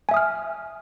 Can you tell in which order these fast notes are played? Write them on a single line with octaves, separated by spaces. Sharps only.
G#5 E5 D#6 F6